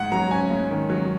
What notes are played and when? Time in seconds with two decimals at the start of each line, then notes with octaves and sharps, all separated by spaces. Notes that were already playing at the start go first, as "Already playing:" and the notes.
Already playing: G#2 F#5
0.12 F#3 A#5
0.31 C#4 G#5
0.50 G#2
0.71 D#3
0.90 F#3